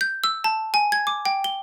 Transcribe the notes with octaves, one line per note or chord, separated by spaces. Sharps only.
G6
E6
A5
G#5
G#6
D6
G5
G7